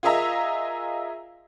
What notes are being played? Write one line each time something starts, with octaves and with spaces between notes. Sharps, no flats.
F4 G#4 A#4 D#5 E5 A#5